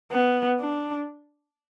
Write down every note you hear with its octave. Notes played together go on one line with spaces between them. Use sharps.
B3
D4